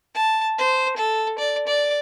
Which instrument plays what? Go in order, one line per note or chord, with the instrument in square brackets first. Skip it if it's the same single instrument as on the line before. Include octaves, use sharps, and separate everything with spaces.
[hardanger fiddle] A5
C5
A4
D5
D5